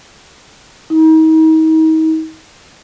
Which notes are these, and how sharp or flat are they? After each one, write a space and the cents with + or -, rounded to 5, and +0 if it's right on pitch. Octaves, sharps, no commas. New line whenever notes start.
D#4 +35